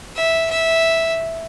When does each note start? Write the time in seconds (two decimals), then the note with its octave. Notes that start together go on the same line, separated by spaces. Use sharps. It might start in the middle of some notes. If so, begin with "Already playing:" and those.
0.16 E5
0.50 E5